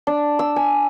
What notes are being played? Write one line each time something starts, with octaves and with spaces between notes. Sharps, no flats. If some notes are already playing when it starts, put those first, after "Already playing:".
D4
E6
G#5